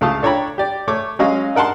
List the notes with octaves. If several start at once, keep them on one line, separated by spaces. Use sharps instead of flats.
C#2 A3 F5 A5 D#6
D4 A4 C#5 G5 A#5 B5
G4 D5
A3 C#5 D6
F#3 G#3 C#4 D#5 F5
D#4 A#4 F#5 A5 C6